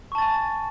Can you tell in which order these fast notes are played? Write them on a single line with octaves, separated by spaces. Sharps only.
C#6 A5 A6 G#5